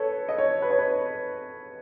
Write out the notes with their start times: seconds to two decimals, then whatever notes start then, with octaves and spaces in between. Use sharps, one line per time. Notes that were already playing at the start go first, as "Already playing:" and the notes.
Already playing: A4 B4 C#5
0.29 D#5
0.38 C#5
0.62 B4
0.70 C#5
0.79 B4